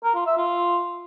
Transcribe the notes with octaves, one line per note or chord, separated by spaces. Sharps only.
A#4
F4
E5
F4